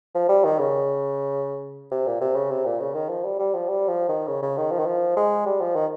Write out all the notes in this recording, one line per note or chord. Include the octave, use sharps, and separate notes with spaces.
F3
G3
D#3
C#3
C3
A#2
C3
C#3
C3
A#2
C#3
D#3
F3
G3
G3
F3
G3
F3
D#3
C#3
C#3
D#3
F3
D#3
F3
G#3
G3
F3
D#3